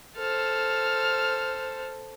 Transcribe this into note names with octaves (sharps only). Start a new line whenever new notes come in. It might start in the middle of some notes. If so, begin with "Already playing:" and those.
A4 C5 F6